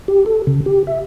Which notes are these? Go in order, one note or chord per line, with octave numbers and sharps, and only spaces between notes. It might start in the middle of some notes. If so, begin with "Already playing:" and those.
G4
A4
C#3
G4
E5